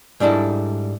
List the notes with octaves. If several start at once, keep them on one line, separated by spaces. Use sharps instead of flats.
G#2 G3 D4 E4 A4